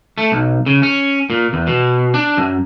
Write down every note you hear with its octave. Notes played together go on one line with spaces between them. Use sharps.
A3
B1
C#3
C#4
A#2
E2
B2
D4
F#2